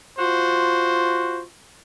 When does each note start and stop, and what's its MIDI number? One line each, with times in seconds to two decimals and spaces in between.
0.18 1.42 65
0.18 1.42 66
0.18 1.42 72